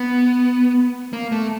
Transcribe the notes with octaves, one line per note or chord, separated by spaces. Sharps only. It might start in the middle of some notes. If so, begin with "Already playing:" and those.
Already playing: B3
A#3
A3